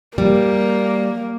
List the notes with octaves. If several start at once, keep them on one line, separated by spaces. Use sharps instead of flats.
G3 A#3